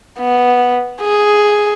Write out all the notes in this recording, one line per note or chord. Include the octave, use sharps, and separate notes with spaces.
B3
G#4